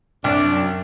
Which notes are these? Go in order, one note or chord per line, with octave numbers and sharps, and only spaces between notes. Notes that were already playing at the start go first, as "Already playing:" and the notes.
C2 F#2 D4